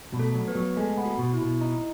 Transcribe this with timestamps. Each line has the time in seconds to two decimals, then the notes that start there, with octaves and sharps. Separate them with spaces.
0.13 B2
0.19 A3 A4
0.34 F#3
0.48 B3 B4
0.55 F#3
0.77 G#3 A3 A4
0.98 B3
1.05 F#4
1.19 B2
1.33 E4
1.41 B2
1.61 D#4